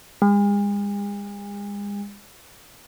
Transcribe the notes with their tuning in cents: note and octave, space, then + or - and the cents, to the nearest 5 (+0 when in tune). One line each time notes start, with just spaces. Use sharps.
G#3 -40